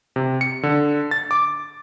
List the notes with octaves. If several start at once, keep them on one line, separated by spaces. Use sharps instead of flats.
C3
C#7
D3
A6
D6